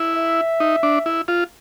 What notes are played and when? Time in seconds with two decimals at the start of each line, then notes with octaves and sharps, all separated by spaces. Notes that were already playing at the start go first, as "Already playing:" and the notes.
Already playing: E4
0.15 E5
0.60 D#4
0.83 D4
1.06 E4
1.28 F4